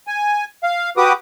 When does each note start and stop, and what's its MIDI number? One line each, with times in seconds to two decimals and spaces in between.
0.07 0.44 80
0.63 0.90 77
0.97 1.13 66
0.97 1.13 67
0.97 1.13 71
0.97 1.13 86
0.97 1.13 87